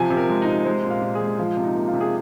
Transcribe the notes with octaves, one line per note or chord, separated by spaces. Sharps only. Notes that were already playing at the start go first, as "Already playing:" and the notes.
Already playing: C3 F3 G#5
C3
A#4
G#3
D#4
C3
G#3 C5
A#2
F5
A#2
G#4
G#3
F3 F4
C3
D#4
A#3
F4
C3
G#4